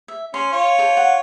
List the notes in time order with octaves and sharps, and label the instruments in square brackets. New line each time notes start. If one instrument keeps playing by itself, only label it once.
[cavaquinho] E5
[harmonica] C#4 [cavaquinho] C6
[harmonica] F4 C#5 F5
[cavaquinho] A4 C5
F#5